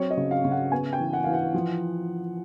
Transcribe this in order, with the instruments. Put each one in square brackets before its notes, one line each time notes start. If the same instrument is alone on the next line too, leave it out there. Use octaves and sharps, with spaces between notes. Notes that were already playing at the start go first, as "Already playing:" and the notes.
Already playing: [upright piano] F#3 C4 C#5
D#5
C#3
F5
C#3
F#5
B3 G#5
G5
E3
F#5
E3 F5
F#5
F3